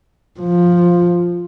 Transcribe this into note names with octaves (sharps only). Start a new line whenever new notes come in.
F3